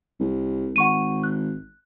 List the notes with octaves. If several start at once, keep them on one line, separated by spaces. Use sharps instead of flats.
C2
G#1 F#5 C#6 D#7
F#6